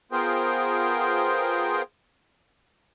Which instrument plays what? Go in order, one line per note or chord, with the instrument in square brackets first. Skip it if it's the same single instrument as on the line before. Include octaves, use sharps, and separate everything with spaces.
[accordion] B3 F4 G#4 A#4 C5 G5